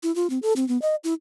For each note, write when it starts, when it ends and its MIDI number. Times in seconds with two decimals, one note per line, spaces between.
0.03 0.14 64
0.15 0.29 65
0.30 0.39 60
0.42 0.53 69
0.56 0.67 60
0.68 0.80 59
0.82 0.95 75
1.04 1.14 64